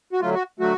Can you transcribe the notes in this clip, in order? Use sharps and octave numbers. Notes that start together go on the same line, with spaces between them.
F#4
D3 F#3 A3 F4
F#4
D3 F#3 A3 F#4